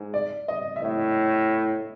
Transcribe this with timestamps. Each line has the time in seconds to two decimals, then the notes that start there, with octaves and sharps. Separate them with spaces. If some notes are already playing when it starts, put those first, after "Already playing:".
Already playing: G#2
0.14 D5
0.48 D#5
0.76 E5
0.82 A2 D#5